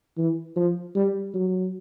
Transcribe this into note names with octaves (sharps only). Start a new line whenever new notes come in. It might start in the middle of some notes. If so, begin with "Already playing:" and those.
E3
F3
G3
F#3